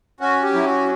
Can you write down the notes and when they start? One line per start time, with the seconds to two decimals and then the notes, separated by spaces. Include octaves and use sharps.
0.20 C#4 F#4
0.43 G4
0.54 F#3 E4
0.65 F#4